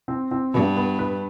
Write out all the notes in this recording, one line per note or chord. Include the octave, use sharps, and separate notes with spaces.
C4
C4
G2 B3
B3
B4